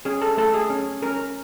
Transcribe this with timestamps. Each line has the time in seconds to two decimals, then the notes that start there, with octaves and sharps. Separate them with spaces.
0.05 C#4 G#4
0.22 A4
0.37 A3 A4
0.54 G#4
0.70 C#4
1.02 C#4 A#4